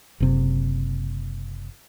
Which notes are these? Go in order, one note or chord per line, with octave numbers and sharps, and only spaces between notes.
F#1 C3